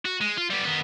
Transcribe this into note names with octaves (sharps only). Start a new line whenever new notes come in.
F#4
G#3
F4
G3 B3
D#3 B3